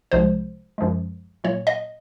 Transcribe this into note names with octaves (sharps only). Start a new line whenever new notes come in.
C2 C3 F3 G#3 C5
F#2 F3 G#3
A#2 F#3 A#3 C#5
D#5